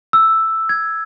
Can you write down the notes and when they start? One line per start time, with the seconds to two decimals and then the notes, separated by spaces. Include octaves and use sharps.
0.13 E6
0.69 G#6